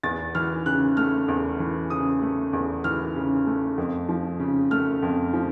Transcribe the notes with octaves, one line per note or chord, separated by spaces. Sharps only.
E2 A6
E3 F6
C#3 F#6
A3 F6
E2
E3
C#3 D#6
A3
E2
E3 F6
C#3
A3
F2
F3
C#3
A3 F6
F2
F3